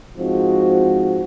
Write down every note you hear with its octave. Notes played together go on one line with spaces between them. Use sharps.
G#2 F3 C4 F#4